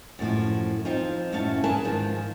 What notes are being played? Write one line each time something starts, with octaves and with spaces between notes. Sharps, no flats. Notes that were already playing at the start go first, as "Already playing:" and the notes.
F#2 A2 D3 F3
F3 C4 D#4 F4
F#2 A2 C#4 F5 A5
G#4 A#4 B4 G#5 A5
G#2 D#3 F3